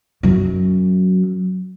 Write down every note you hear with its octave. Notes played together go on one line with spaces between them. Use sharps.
F#2 F#3